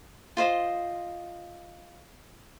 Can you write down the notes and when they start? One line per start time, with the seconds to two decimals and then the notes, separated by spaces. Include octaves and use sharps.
0.37 F4 C5 D#5